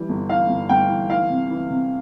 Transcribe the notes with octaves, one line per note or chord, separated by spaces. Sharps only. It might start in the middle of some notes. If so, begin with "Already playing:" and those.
Already playing: E3 G3
G1
E3 F5
G1
G1 G5
E3
E3 F5
C3
E3
C3